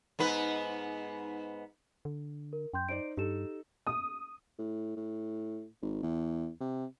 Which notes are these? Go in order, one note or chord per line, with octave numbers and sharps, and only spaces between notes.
G#2 B3 B4
D3
A#4
F#2 G5 C6 G6
D#4 C5 D5 D7
G2 D#4 G4 A4 E7
D#6
A2
A2
G#1
E2
C3